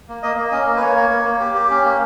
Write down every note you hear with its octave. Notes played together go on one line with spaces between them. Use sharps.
A#3
A#3 D#5
A#3
C#4 D#5
A#3
B4
A#3 C#5
A#3
A#3
A#3
G4
G4
C#4
A#3